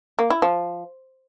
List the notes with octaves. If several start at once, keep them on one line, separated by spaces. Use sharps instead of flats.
A#3
E4
F3